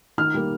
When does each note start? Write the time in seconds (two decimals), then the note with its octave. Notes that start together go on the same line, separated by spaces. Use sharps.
0.18 D#3 F6
0.34 G3 A#3